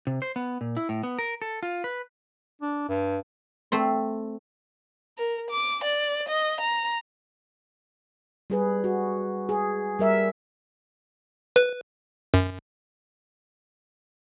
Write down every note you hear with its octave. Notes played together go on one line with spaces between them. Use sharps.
C3
C5
B3
A#2
E4
A2
B3
A#4
A4
F4
B4
D4
G2
A3 C4 C6
A#4
D6
D5
D#5
A#5
G3 G#4 B4
F#4
G#4
G3 A#4 E5
B4
F#2